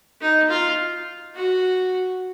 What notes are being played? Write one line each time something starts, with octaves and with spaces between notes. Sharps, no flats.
D#4
F4
F#4